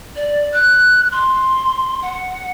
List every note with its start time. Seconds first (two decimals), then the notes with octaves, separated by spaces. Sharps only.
0.16 D5
0.53 F#6
1.12 C6
2.02 F#5